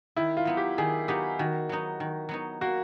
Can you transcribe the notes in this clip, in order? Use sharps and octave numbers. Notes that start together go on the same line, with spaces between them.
D#3 E4
F4
F#3 B3 D#4
G4
D#3 G#4
F#3 B3 D#4 G4
D#3 F#4
F#3 B3 D#4
D#3
F#3 B3 D#4
A#3 F#4